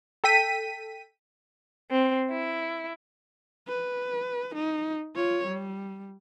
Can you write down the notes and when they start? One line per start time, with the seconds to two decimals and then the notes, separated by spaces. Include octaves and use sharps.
0.24 A4 G5 B6 D#7
1.91 C4
2.31 E4
3.68 B4
4.55 D#4
5.16 F4 C#5
5.47 G3